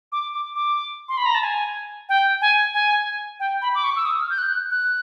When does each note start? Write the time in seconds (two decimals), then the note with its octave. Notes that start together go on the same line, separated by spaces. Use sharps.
0.12 D6
0.34 D6
0.56 D6
1.09 C6
1.17 B5
1.26 A#5
1.35 A5
1.43 G#5
2.09 G5
2.41 G#5
2.74 G#5
3.40 G5
3.62 B5
3.75 D6
3.84 C#6
3.96 E6
4.05 D#6
4.22 F6
4.30 G6
4.38 F#6
4.55 F#6
4.71 F#6